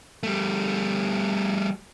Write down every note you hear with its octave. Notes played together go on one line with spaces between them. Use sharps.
G3 A3